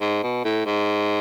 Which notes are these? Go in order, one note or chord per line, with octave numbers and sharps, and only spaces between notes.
G#2
B2
A2
G#2